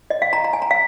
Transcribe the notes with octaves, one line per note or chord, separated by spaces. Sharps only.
D#5
F5
A#5
A#5
G#5
A#5
F5